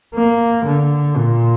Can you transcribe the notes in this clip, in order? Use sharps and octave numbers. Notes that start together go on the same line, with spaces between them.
A#3
D3
A#2